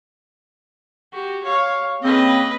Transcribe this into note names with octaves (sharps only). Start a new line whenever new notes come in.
F#4 G4
C#5 F5
C#3 A#3 C4 B4 D#5